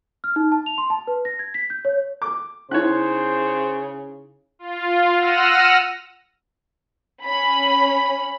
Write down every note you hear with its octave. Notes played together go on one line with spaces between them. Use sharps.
F6
D#4
A5
F7
C6
A5
B4
A#6
G#6
B6
G6
C#5
D6
C#3 C#4 D#4 E4 C5 C#5 F#6
F4
F#5 E6 F6 A#6 D#7
C#4 B5